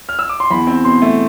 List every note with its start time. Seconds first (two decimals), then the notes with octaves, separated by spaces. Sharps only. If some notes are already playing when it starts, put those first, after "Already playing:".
0.09 F6
0.19 E6
0.29 D6
0.40 C6
0.51 E2 B5
0.67 C4
0.84 B2 C6
1.02 A3